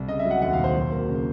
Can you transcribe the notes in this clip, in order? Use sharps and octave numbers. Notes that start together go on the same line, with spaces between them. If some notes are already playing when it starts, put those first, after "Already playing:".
Already playing: C2
C#3 D#5
E5
F#3
F#5
D#2 F#5
F5
E1
C5
F#3
A#3
C#3